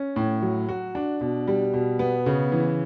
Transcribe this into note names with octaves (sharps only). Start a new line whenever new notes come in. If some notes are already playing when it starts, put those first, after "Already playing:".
Already playing: C#4
A2
F#3
F#4
D4
B2
G3
B2
B3
C#3
E3